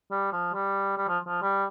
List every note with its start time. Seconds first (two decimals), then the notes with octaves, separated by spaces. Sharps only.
0.11 G3
0.32 F3
0.54 G3
0.97 G3
1.08 F3
1.27 F3
1.42 G3